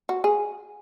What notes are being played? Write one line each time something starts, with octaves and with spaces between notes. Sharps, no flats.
F#4
G#4